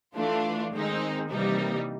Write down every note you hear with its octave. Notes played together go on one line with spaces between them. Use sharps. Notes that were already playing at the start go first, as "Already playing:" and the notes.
E3 A3 D4 F4
D#3 G#3 C4 D#4
C3 E3 G3 A#3 D#4